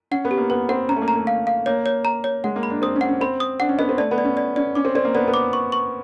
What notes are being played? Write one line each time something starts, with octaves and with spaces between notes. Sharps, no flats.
C#4 F#5
B3
G4
A#3
B3 B4
C4 F#5
C#4 A#5
A3
A#3
A#5
A3
F5
F5
A#3 C#5
C#5
A#5
C#5
G#3 F#5
A#3
B5
D4
C4 D#6
C#4
F#5
C#4
C4 B5
D#6
D4 F#5
C#4
B3 D#5
C4
A3 D5
B3
D5
C#4
D5
C#4 D5
C#4 D6
C4
C4 D5
A#3
B3 D5
B3
D6
C#6
C#6